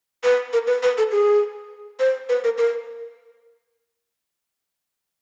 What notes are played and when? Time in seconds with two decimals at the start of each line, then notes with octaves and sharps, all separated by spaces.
0.24 B4
0.53 A#4
0.67 B4
0.83 B4
0.98 A4
1.12 G#4
2.00 C5
2.29 B4
2.44 A#4
2.58 A#4